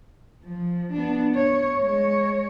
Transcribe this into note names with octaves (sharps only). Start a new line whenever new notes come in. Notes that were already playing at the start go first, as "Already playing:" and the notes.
F3
B3 D4
C#5
G#3 C#5